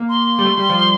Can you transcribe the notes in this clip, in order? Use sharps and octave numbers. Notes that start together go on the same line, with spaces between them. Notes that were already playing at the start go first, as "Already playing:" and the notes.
Already playing: A#3
C6
G3
A3
G3
F3